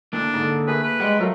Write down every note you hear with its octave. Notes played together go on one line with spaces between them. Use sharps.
D2 A#3 D4 E4
G#2 D3
A3 G#4 A#4 B4
B4
G3 G#3 G#4 F#5 G5
F#3 A3 F4 A#4